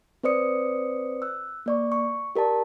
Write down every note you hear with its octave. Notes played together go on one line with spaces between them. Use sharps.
C4 B4 C5 D5 D#6 C#7
E6 F#6
A#3 D5 C#6
C#6
G4 A#4 D5 A5